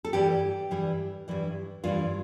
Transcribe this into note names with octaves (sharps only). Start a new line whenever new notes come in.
A4
G2 E3 G3 G4
G2 E3 G3
G2 E3 G3
G2 E3 G3 F4